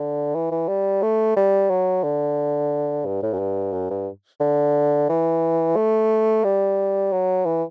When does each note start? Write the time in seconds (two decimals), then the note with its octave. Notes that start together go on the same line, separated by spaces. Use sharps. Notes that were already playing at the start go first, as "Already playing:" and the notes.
Already playing: D3
0.35 E3
0.51 E3
0.68 G3
1.03 A3
1.36 G3
1.70 F#3
2.03 D3
3.05 G2
3.23 A2
3.33 F#2
3.39 G2
3.73 F#2
3.90 G2
4.40 D3
5.09 E3
5.76 A3
6.44 G3
7.12 F#3
7.46 E3